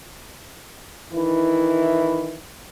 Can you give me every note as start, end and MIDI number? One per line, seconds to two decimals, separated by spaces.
1.12 2.39 51
1.12 2.39 52
1.12 2.39 64